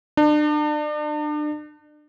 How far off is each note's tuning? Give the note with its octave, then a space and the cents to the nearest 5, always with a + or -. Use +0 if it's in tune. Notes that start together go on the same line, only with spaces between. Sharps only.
D4 +35